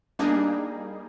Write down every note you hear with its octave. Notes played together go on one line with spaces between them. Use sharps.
G3 A#3 D4 D#4 G#4